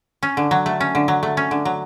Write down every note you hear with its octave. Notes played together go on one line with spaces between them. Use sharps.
C#4
D3
F#3
A3
C#4
D3
F#3
A3
C#4
D3
F#3